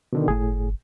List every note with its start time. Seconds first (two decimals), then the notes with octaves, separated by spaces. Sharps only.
0.13 B2 D3 D#3
0.28 G1 A2 G#4